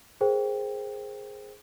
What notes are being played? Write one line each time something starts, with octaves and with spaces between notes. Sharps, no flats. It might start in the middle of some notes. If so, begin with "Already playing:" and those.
G#4 A#4 C5 G5